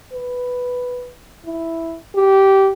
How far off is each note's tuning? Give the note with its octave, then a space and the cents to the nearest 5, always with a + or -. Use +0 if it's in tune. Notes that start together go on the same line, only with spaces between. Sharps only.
B4 +0
E4 +0
G4 -15